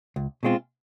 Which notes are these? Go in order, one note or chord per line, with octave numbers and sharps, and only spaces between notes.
C#2
B2 G#3 C4 F4